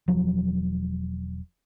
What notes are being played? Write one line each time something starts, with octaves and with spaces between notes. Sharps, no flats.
E1 F3 F#3